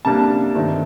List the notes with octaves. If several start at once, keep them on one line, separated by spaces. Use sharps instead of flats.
C3 G3 A#3 D4 A5
G2 D#3 A3 C4